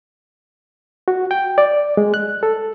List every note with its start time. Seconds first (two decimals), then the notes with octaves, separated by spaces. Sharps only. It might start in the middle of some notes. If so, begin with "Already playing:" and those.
1.08 F#4
1.31 G5
1.58 D5
1.97 G#3
2.14 F#6
2.43 A4